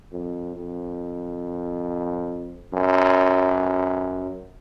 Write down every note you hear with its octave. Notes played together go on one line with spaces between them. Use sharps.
F2
F2
F#2